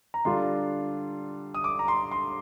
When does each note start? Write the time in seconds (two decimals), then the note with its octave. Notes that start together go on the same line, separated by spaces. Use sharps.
0.14 A#5
0.25 D3 G3 D4 F4 C6
1.54 D#6
1.64 D6
1.79 A#5
1.88 C6
2.11 C6